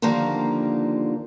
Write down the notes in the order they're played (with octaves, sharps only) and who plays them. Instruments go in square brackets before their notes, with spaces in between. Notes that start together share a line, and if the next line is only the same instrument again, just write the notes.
[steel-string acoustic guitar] D3 D#3 F3 G3 A#3